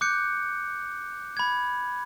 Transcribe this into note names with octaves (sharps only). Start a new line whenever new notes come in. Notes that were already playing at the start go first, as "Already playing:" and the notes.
D6 F#6 G6 C#7
B5 G#6